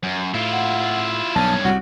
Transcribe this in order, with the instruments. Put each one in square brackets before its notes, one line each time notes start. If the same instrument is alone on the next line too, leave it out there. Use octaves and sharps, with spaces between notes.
[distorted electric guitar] F#2
[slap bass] A2 [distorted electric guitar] E4 F4
[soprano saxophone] F#5
[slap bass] B1 [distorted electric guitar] G2 C#4 [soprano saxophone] A5
[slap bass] C2 C3 [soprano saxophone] F#4